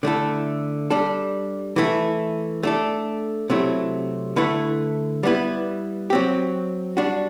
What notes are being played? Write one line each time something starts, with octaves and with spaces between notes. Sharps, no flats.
D3 A3 E4 A4
G3 D4 A4
E3 A3 E4
A3 D4 A4
C3 F#3 A3 E4
D3 A3 E4 B4
G3 B3 E4 B4
F#3 C4 G4
G3 D4 F#4